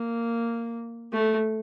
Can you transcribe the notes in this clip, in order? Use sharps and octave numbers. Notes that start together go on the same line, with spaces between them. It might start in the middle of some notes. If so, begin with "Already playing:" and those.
Already playing: A#3
A3